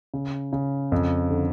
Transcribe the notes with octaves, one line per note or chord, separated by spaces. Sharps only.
C#3
C#3
F2
D3